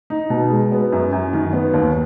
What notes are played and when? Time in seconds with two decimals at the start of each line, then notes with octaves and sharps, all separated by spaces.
0.10 D#4
0.30 B2
0.50 G#3
0.72 B3
0.92 F#2
1.13 F#2
1.33 D#3
1.53 B3
1.73 D#2